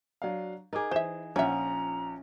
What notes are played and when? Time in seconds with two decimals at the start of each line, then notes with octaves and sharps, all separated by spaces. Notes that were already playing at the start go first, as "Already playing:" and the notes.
0.22 F#3 D4 F5
0.73 D#4 G#4 A#4 D6
0.91 E3 C5 E5 E7
1.36 A#1 F3 C#4 C#5 E5 F#5 A#5